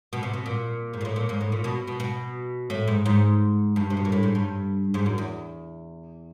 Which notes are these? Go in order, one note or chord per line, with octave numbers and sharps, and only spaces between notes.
B2
C3
B2
A#2
G#2
A#2
A2
A#2
G#2
A2
A#2
B2
B2
B2
A2
G#2
G#2
G2
C3
B2
A#2
A2
G#2
G2
G#2
F#2
E2